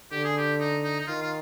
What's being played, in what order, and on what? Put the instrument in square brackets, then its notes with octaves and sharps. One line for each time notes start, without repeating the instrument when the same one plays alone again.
[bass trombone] D3 [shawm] G4
[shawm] G#4
G4
D#4
D#4
D#4
[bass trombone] D#3 [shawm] F4
[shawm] F4